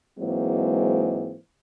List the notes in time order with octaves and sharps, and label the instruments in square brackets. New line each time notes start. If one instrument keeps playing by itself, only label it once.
[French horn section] G#2 E3 F#3 G#3 A#3 C4